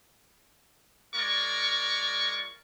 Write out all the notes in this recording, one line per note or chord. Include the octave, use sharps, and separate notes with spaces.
G#3 F4 A#4 D5 C#6